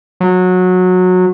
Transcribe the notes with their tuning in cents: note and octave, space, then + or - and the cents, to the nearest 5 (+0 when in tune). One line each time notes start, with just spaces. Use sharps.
F#3 -20